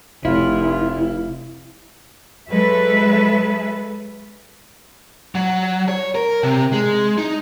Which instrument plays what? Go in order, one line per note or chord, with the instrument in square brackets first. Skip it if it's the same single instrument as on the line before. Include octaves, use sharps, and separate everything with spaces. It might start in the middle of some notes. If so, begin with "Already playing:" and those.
[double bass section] F1 [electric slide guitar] E4 [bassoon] F4
[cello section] F#3 G#3 A4 B4 E5
[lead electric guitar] F#3
C#5
A#4
C3
G#3
D#4